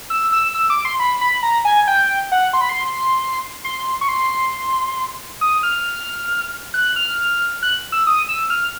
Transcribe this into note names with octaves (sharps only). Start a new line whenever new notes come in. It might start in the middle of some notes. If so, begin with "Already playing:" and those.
E6
E6
E6
D6
C6
B5
B5
A#5
G#5
G5
F#5
C6
B5
C6
C6
C#6
C6
D#6
F6
F#6
F6
F#6
E6
D#6
E6
F6